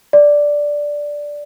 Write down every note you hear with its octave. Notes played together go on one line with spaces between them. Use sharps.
D5